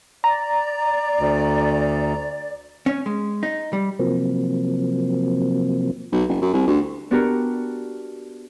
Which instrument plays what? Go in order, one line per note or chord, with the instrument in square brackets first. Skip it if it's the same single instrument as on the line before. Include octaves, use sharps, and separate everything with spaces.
[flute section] D5 [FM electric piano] A#5
[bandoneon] D2
[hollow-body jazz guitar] C#4
G#3
D#4
G3
[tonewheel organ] C3 F3 F#3 A#3 C4
[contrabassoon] B1
F#1
F#2
C2
D2
[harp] B3 D4 F#4 G4 A#4